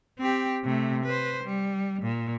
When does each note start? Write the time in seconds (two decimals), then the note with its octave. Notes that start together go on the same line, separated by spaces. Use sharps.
0.19 C4 G4
0.64 C3 A3
1.05 B4 C5
1.44 G3
2.03 A#2